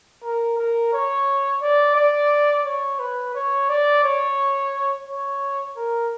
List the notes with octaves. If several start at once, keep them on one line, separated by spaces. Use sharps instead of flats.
A#4
A#4
C#5
D5
D5
C#5
B4
C#5
D5
C#5
C#5
A#4